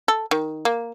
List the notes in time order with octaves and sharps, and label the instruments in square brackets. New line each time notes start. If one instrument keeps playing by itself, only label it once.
[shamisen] A4
D#3
A#3